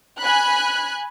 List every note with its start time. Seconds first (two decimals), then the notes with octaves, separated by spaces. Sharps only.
0.20 G#5 B5 F#6